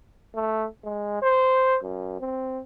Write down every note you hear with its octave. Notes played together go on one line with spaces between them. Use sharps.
A3
G#3
C5
F#2
C4